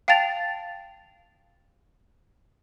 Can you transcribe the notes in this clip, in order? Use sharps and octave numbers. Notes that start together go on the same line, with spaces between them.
F5 G5 A5 A6 F7